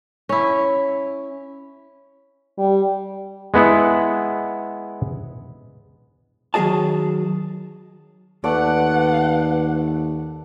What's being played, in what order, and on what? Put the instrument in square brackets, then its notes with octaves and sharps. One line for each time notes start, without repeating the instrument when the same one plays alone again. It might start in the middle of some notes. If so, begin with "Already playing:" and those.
[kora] C#4 E4
[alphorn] G3
[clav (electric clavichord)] G#3 B3 E4 F#5
[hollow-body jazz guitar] D#3 F#3 A#3 G#4 D#5 A5
[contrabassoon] D#2 [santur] A3 D5 [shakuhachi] B4 [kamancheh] F#5